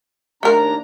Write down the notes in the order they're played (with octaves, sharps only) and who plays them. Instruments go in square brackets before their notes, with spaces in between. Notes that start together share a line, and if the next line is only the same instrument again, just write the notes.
[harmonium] D#2 D4 A#5 [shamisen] A3 A#4